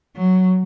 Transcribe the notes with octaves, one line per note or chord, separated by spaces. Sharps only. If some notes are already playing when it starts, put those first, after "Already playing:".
F#3